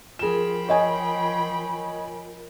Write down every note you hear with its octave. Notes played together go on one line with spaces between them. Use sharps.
F3 F4 G#4 A#4 G5 B5 E7
C#5 D#5 G#5